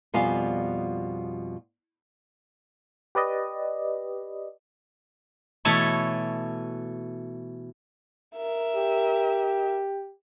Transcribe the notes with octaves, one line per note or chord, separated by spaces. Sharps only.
F2 B2 G3 F4 F5 G#5
G4 B4 D5 D#5
B2 E3 A3 A4 C#5 B5
A#4 E5
G4